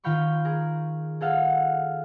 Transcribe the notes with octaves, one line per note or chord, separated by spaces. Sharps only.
D#3 F4 F5 G5 B5 C#6
G#4 A#4
G#4 A4 F5 F#5